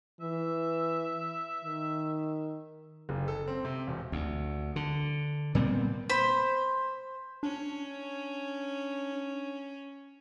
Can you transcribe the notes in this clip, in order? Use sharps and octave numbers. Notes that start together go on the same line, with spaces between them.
E3 E5
D#3
F#1
A4
C4
C3
E1
D2
D3
A#2 G3 B3 C4
C5 B5
C#4 D4